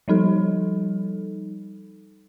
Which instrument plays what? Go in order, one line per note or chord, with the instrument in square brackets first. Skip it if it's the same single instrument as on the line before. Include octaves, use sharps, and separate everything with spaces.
[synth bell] F3 G3 D#4 A4